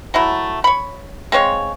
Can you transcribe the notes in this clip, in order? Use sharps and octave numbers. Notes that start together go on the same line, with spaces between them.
F#3 A3 E4
C#5 B5
G#3 C4 C#5 F5